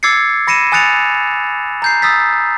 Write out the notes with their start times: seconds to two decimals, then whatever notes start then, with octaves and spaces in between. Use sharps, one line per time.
0.03 D6 E6 G#6 A6 C7 C#7
0.47 B5 A#6 C#7 D#7 E7
0.72 G#5 D#6 F#6 A6 C#7 F7
1.82 A#5 G6 C7
2.02 D#6 E6 A6 B6